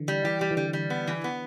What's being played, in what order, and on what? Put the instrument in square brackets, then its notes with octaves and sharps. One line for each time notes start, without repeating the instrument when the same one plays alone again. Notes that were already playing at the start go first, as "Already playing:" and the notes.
Already playing: [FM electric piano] D3 E3
[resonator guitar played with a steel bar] G3
[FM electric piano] E3 [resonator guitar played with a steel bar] G4
[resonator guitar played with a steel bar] G3
[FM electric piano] E3
[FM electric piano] D3 [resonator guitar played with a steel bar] G3
[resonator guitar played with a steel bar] G3
B3
E3
B3